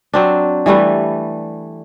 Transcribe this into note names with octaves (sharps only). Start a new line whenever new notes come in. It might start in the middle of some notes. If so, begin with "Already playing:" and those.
F#3 C4 D4
E3 G3 A3 B4